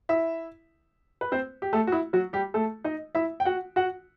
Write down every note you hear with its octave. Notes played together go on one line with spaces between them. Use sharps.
E4 E5
B4
C4 C5
G4
A3 A4
F#4
E4
F#3 F#4
G3 G4
A3 A4
D#4 D#5
E4 E5
G5
F#4 F#5
F#4 F#5